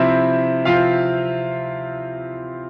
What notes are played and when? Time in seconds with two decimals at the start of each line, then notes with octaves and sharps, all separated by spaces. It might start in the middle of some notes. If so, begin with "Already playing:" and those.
Already playing: C3 F3 C4 E4 E5
0.65 C3 F3 C4 F4 F5